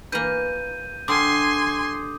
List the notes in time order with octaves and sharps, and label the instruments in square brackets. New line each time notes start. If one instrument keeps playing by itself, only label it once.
[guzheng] E3 A#3 [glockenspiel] G6 D#7
[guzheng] D3 G3 [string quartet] G#5 C6 [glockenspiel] D6 D#6